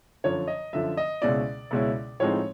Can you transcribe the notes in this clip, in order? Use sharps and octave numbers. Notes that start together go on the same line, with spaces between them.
F#2 D3 F3 C#5
D#5
F#2 D3 F3 E5
D#5
C#2 B2 G#3 C#4 E4 D5
C#2 B2 G#3 C#4 E4
A2 F3 G#3 C4 D#4 C#5